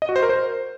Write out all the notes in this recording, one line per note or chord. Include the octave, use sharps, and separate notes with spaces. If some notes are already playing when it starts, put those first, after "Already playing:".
D#5
F#4
C5
A#4
C5